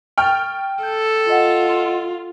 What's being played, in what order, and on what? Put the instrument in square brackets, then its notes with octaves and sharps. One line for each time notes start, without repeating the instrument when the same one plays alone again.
[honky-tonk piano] G5 F6 [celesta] C#6 A6
[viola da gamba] A4 [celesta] G6
[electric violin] F4 [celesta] D#5 F#5